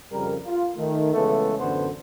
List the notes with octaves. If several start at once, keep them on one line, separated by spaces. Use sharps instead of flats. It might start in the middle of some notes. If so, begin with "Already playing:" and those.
F2 C#3 G3 A#4
F4
D#3 A3
C#3 E3 G#3 A3 B3 A4
A1 F#2 D3 B3 C5